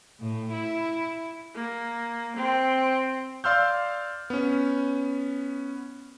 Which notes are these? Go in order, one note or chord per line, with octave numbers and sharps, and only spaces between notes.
A2
E4
A#3
C4
D5 F5 C6 E6 F6 G6
B3 C#4